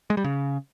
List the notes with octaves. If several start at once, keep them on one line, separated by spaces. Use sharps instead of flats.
G#3
G3
C#3